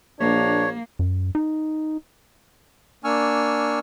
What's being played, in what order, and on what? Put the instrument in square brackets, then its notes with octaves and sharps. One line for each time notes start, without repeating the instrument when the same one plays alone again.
[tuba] A#1 [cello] A#3 [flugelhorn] D4 [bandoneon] C#5
[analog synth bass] F#2
D#4
[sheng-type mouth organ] A#3 D4 G#5 C#6 E6 F6